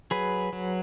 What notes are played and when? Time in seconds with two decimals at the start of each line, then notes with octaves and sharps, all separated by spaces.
0.11 F#3 G#4 B4
0.53 F#3